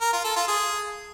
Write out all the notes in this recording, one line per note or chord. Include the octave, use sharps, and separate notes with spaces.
A#4
F4
A4
F4
G#4